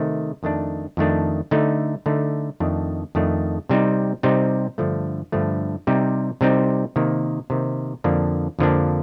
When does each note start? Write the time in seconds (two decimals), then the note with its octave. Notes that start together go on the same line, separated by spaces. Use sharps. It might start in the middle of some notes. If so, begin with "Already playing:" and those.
Already playing: C3 D#3 A3
0.43 F2 D#3 A3 D4
0.97 F2 D#3 A3 D4
1.51 D3 A3 D#4
2.06 D3 A3 D#4
2.60 F2 D#3 A3 D4
3.15 F2 D#3 A3 D4
3.69 C3 G3 C4 D#4
4.23 C3 G3 C4 D#4
4.78 G2 D3 F3 A3
5.32 G2 D3 F3 A3
5.87 C3 G3 C4 D#4
6.41 C3 G3 C4 D#4
6.96 C3 D#3 A#3
7.50 C3 D#3 A#3
8.04 F2 D3 F3 A#3 D4
8.59 F2 D3 F3 A#3 D4